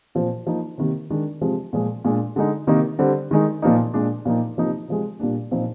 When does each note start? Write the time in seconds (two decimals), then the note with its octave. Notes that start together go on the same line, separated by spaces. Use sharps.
0.15 A#2 F3 C4
0.47 F3 A#3 D#4
0.78 C3 D#3 A#3
1.10 D#3 G#3 D4
1.41 C3 F3 G#3
1.73 A#2 F3 G#3
2.05 A#2 G#3 D4
2.36 D3 G#3 D#4
2.67 C3 D#3 A#3 D#4
2.99 D3 G3 C4
3.31 D#3 G#3 D#4
3.62 A#2 F3 A#3 D#4
3.94 A#2 G#3 D4
4.25 A#2 F3 A#3 D#4
4.57 C3 F3 A#3 D#4
4.88 C3 F3 G#3
5.20 A#2 G3 A#3 D4
5.51 A#2 F3 C4 D#4